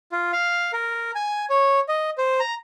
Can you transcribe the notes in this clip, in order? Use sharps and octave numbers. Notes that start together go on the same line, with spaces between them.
F4
F5
A#4
G#5
C#5
D#5
C5
A#5